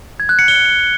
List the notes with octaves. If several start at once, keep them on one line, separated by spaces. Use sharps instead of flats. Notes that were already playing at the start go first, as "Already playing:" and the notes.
G#6
F#6
C#7
G7